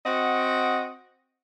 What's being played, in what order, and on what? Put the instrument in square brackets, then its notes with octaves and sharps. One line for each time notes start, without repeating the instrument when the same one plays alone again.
[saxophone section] C4 F#4 D#5 F#5